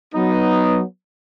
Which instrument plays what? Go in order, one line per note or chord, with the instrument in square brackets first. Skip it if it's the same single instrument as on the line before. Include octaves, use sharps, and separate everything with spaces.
[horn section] F#3 B3 D#4